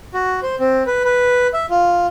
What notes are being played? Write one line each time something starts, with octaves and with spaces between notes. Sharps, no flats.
F#4
C5
C4
B4
B4
E5
F4